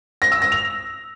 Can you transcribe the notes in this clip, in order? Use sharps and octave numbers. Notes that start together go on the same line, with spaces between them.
A#6
E6
A#6
F7